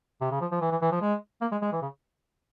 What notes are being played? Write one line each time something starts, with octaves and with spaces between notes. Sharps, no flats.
C3
C#3
F3
F3
E3
E3
E3
F3
G#3
A#3
G#3
G#3
E3
C#3